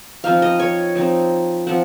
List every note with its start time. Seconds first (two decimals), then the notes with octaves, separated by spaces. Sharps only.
0.24 F3 C4 D#4 F5
0.42 D#5
0.60 C#5
0.95 F3 C4 D#4
1.67 F3 C4 F#5